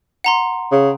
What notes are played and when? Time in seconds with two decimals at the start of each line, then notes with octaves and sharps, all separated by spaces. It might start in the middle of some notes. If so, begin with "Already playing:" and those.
0.24 F#5 A#5 C6
0.72 C#3